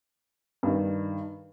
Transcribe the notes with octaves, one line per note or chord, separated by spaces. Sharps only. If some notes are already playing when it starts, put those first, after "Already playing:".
G2 D#3